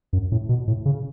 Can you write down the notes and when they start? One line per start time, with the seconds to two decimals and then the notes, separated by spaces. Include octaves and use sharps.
0.13 F#2
0.32 A2
0.49 B2
0.68 A2
0.86 C#3